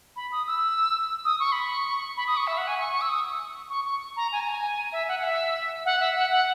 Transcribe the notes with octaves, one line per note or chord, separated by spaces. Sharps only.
B5
D#6
E6
D#6
C#6
B5
C#6
B5
D#6
C#6
E5
F#5
G#5
C#6
C#6
E6
D#6
C#6
C#6
A#5
G#5
A#5
G#5
E5
F#5
F#5
E5
F#5
E5
F#5
F#5